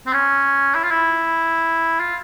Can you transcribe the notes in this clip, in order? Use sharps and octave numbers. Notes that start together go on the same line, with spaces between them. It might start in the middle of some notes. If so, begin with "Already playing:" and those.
C4
C#4
E4
F4
E4
F4